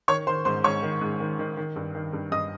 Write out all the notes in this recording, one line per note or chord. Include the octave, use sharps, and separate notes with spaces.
D#3 C#5 C#6
D#3 C5 C6
G#2 C5 C6
G#2 C#5 C#6
D#3
G#2
D#3
D#3
D#3
G2
D#3
G2
G2 D#5 D#6